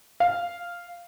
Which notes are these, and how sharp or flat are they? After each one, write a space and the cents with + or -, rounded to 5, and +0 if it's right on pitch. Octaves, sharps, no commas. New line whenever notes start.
F5 -5